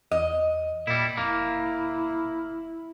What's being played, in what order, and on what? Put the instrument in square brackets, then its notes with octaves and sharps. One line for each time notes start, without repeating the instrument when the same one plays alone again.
[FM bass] E2 [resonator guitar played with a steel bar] D#5
[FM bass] A#2 [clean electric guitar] G3 E4
[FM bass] F1 [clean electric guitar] A#3 [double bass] E4